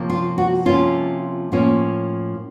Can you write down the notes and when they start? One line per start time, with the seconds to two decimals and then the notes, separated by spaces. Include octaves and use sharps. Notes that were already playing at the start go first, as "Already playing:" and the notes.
Already playing: C3 F3 A#3 C#4
0.10 F4
0.38 F#4
0.66 C3 F3 A#3 C#4 F4
1.52 A2 F3 A#3 C#4